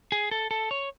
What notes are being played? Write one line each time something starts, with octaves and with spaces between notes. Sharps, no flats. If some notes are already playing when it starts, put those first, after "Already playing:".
G#4
A4
A4
C#5